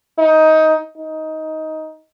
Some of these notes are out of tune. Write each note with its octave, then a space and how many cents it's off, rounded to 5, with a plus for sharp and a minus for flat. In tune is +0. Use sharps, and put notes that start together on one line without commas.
D#4 +15
D#4 +15